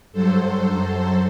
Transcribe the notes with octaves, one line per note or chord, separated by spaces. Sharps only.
G2 F#3 A4 C5
F#2 F#3